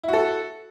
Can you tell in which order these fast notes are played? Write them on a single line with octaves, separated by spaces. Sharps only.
E4 F#4 A4